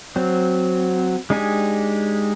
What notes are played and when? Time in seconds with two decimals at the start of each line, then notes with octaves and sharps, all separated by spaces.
0.16 F#3 C4
1.30 G#3 D4 D#4 G4 G#5